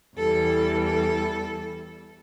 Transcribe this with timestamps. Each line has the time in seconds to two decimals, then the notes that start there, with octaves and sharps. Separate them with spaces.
0.17 E2 E3 G3 A4
0.84 A4